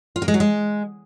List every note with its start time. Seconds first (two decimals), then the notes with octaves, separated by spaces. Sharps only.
0.16 F4
0.22 A#3
0.28 G#3
0.34 F#3
0.40 G#3